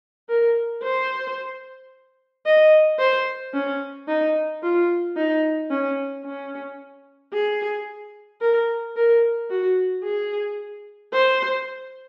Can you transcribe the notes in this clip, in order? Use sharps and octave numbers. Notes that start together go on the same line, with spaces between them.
A#4
C5
D#5
C5
C#4
D#4
F4
D#4
C#4
C#4
G#4
A#4
A#4
F#4
G#4
C5